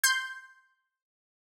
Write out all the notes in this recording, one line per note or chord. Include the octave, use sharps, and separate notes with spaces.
C6 G6